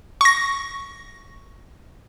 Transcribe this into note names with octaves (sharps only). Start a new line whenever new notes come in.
C#6 A#6